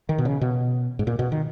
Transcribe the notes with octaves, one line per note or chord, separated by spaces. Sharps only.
D#3
B2
C#3
B2
G#2
A#2
B2
D#3